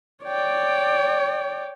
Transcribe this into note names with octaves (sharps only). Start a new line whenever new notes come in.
C#5 D5 G5